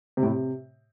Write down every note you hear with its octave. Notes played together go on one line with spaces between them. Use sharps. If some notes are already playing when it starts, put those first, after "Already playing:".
C3
A2
C3